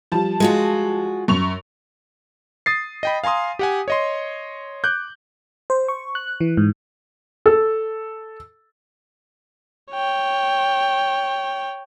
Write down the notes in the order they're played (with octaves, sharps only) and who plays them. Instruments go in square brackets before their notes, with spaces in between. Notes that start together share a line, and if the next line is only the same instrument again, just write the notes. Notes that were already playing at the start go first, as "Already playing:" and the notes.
[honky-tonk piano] F3 G3 A5
[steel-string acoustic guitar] G#3 F4 F#4
[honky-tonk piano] F#2 C#6 F7
[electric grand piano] D#6 A6 C7
D#5 G5 B5
F5 G#5 A#5 C6 D#6
G4 F#5 G#5
C#5 D#5 C6
D6 F#6 G6
[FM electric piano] C5
C#6
F#6
E3
G#2
[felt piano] A4
[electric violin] C#5 G5